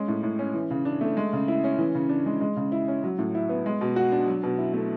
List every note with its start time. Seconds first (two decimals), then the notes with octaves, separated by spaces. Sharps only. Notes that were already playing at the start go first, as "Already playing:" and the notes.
Already playing: G#3 C#4
0.08 A2
0.23 A2
0.39 C#4
0.54 E3
0.71 C#3
0.85 D4
1.01 A3
1.17 G#3
1.33 C#3
1.48 E4
1.64 C#4
1.78 E3
1.95 C#3
2.09 D4
2.26 G#3
2.41 G#3
2.57 C#3
2.72 E4
2.88 C#4
3.04 F#3
3.19 A2
3.35 E4
3.49 B3
3.66 G#3
3.81 B2
3.96 F#4
4.12 D4
4.27 F#3
4.43 B2
4.59 E4
4.74 A3